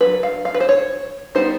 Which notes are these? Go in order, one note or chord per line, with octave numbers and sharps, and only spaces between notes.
F#3 A#3 D4 B4
F5
F5
B4
C5
C#5
G3 B3 D#4 C5